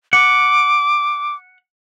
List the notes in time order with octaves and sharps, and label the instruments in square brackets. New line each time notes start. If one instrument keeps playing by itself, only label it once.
[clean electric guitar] F#5 [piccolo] D6